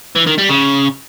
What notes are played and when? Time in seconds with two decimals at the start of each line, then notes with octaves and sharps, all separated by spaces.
0.16 E3
0.27 D#3
0.38 G3
0.50 C#3